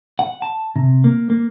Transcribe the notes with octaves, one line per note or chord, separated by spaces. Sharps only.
F#5
A5
C3
A#3
A#3